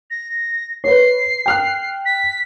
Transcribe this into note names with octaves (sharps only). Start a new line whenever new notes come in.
A#6
B4 C#5 C7
G5 F6 F#6
B6